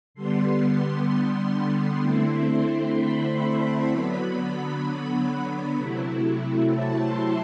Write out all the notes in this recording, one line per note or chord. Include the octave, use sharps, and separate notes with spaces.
D3 G3 B3 C6
D3 A3 C4 E4 C6
B5
D3 F#3 B3
C3 F#3 A3 E4
A5
C6